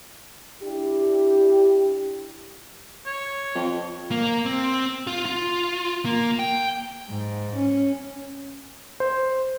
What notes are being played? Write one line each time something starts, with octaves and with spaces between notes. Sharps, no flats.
D4 E4 G4
C#5
F2
A#3
C4
F4
F4
A#3
G5
G#2
C#4
C5